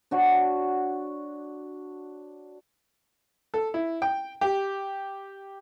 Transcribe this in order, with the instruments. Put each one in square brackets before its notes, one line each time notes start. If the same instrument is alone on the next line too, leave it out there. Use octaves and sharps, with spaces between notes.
[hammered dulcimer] D4 F#4 C#5
[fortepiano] A4
E4
G5
G4